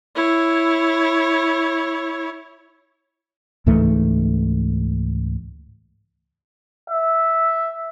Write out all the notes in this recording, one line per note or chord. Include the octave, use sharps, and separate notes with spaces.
E4 C#5
C#2 G#2 E3 A3
E5